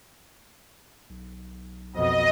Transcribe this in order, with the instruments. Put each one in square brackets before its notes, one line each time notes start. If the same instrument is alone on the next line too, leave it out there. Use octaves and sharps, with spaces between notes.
[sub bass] B1
[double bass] F2 B2 [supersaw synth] D#5